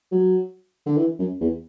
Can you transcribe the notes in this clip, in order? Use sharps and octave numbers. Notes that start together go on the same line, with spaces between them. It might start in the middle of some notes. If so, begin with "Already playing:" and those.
F#3
D3
E3
F#2
E2